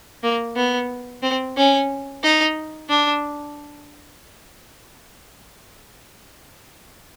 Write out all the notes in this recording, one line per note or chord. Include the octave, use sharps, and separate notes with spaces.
A#3
B3
C4
C#4
D#4
D4